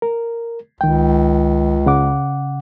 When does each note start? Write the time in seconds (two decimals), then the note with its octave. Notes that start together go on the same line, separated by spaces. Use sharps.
0.02 A#4
0.81 C#2 D#3 G5
1.86 C#3 F#5 D6